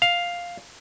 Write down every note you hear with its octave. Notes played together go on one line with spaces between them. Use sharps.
F5